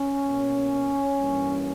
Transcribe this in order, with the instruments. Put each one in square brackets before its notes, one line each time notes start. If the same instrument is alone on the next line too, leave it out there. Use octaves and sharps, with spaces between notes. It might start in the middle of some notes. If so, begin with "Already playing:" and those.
Already playing: [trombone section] C#4
B2 A#3
G2 E3 G3 A#3